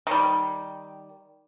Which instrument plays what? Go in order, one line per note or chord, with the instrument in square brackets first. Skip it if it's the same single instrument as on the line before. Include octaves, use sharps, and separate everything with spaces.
[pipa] D#3 G3